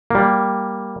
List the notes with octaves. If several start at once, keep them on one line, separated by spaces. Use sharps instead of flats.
G3 A#3